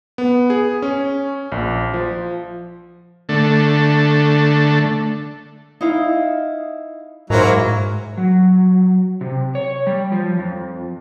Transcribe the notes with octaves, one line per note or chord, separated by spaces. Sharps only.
B3
G#4
C#4
A#1
F3
D3 A3
D#4 E4 F5
G#2 F#3 A#3 E4 A#4 C5
F#3
C3
C#5
G3
F3
F2